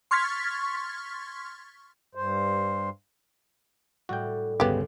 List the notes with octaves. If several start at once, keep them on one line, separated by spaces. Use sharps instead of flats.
C6 C#6 F6 G#6 A6 B6
G2 C5
A2 G3 F#4 G5
G1 C#2 C#3 B3 G4